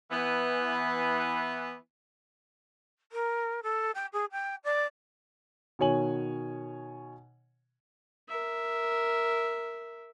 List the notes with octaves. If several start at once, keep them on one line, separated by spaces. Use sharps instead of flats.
E3 B3
A#4
A4
G5
G#4
G5
D5
B2 D#3 C#5 G#5 F#7
A#4 E5